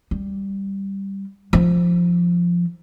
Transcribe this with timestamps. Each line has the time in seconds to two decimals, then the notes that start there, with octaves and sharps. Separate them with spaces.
0.11 G3
1.53 F3 D#4